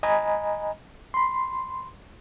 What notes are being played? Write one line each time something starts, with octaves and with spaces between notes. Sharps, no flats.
D#5 G#5 A#5 B5
B5 C6